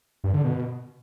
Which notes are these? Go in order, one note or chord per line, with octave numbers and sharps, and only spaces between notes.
G2
D3
B2